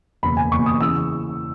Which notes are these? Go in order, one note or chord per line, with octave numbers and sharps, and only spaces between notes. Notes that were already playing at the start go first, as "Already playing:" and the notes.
F#1 E2 B2 B5
G#5
F#1 E2 B2 C#6
D#6
C#3 E3 E6